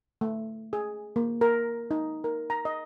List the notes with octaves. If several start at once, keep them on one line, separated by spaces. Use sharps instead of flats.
A3
G#4
A#3
A#4
D#4
A#4
A#5
D#5